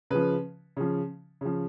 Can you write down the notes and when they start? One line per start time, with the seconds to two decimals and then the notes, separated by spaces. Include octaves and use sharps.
0.10 C#3 F3 B4
0.77 C#3 F3
1.41 C#3 F3